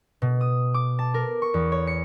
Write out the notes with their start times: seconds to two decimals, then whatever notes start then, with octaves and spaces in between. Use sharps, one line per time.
0.22 B2
0.41 D#6
0.74 D6
0.99 A5
1.14 A#4
1.42 C#6
1.54 E2
1.72 C#5
1.87 C#7